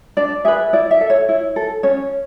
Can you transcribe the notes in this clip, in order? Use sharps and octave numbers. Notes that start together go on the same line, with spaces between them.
D4 D5
G#4 B4 E5
E4 D5
E5
A4
C#5
E4
A4
C#4 C#5